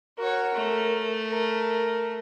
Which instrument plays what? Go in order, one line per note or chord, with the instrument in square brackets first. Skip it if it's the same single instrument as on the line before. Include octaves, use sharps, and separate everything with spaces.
[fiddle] F#4 C#5 [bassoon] A#4
[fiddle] A3
[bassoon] A#4